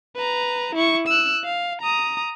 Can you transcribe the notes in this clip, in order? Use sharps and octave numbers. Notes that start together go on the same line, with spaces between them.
B4 A#5
E4 C#6
E6 F#6
F5
A#5 D#6